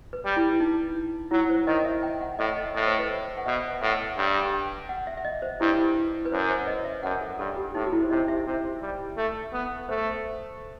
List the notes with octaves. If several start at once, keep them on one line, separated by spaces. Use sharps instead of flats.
B4
G3
E4
D#4
F#3 E4
C5
D#3 D#5
D#5
E5
G5
F#5
A2 D#5
D#5
A2 D#5
C5
B4
C5
F#5
B2 E5
A2 F#5
G2 G5
G5
F#5
E5
E5
D#5
C5
G2 E4
B4
F#2 C5
C5
D#5
E5
F#2 F#5
A4
G2 A4
G4
A2 D#4
F#4
E4
C5
C3 D#5
E5
C3
G3
A3
B3
A3 C5